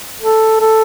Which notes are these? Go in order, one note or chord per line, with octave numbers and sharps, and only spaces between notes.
A4
A4